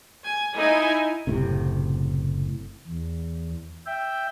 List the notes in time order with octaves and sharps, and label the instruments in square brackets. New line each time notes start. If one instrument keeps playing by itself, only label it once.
[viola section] G#5
D#4 E4 G#5
[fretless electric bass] F#1 A2 C3
[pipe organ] E2
E5 G5